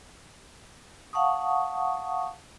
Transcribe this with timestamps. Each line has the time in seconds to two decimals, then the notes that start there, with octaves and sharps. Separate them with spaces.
1.13 F5 F#5 A5 C#6 D#6